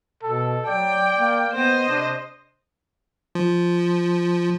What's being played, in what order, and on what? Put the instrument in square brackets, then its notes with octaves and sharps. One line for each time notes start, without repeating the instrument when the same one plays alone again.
[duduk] B2 [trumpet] A4
[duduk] F#3 [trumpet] D5 [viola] G5
[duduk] A#3
[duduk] B3 [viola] C5 D#5
[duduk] C3 [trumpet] D4
[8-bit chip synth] F3